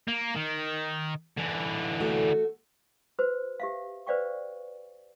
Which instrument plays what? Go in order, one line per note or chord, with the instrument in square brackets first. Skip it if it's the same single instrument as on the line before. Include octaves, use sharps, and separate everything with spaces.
[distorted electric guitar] A#3
D#3
D3 E3
[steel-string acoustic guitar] A3 F#4
[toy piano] F#4 B4 C5
G4 E5 F5
B4 C5 D5 F5 G5 C#6